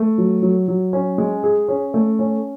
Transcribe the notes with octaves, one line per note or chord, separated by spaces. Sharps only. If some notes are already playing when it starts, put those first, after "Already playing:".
Already playing: A3
F#3
F#3
F#3
C#4
G#3
G#4
C#4
A3
C#4